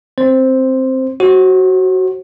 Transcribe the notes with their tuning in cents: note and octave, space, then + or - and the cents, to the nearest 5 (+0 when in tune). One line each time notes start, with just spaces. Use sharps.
C4 +5 C5 +0
F#4 +15 C5 +45